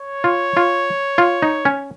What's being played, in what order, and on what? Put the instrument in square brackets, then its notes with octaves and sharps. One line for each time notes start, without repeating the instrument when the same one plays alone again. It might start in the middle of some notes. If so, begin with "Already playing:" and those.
Already playing: [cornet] C#5
[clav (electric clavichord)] F4
F4
F4
D#4
C#4